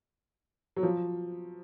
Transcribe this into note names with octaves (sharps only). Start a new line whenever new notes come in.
F#3
F3